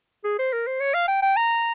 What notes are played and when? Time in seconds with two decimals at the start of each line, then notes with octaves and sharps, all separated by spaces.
0.24 G#4
0.39 C5
0.53 A#4
0.67 C5
0.80 C#5
0.94 F5
1.08 G5
1.22 G5
1.37 A#5